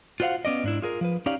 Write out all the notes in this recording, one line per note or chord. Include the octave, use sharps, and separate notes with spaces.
F4 F#4 C5 C#5 F5 F#5
B3 C#4 D5 D#5
G#2 D4 E4
F4 G#4 A#4
F3 B4
C#4 D#4 G4 D5 F5